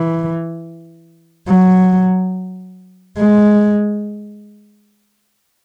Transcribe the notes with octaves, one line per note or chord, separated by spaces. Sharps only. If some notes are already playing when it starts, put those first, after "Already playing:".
Already playing: E3
F#3
G#3